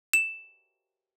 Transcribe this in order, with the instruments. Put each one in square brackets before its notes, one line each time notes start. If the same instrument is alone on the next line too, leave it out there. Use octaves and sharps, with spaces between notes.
[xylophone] E7